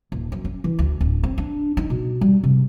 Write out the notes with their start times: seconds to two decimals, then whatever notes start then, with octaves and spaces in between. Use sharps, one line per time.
0.12 D#1
0.32 F#2
0.45 C#4
0.64 E3
0.79 D2
1.01 D1
1.24 C4
1.38 D4
1.77 D#4
1.90 B2
2.21 G3
2.43 C3